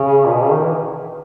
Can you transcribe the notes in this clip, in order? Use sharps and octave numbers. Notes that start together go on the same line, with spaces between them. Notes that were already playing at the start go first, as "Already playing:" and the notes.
Already playing: C#3
A#2
B2
C#3
D#3
E3